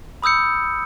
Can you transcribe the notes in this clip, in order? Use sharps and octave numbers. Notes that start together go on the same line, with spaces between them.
B5 D#6 E6 G6 C#7